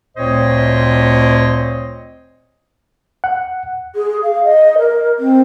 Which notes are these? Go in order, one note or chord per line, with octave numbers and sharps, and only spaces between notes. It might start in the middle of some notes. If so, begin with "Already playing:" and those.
D2 A#2 C4 C5 C#5 D#5
F#5
G#4
F5
D#5
A#4
C4